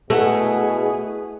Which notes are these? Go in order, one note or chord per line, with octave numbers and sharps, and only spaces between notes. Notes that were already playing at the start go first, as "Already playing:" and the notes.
B2 A3 E4 G#4 B4 F#5